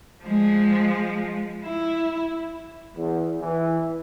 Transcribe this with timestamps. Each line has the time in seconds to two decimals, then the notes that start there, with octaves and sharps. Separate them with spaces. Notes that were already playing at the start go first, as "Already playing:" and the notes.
0.24 F3 G#3
1.65 E4
2.97 E2
3.42 E3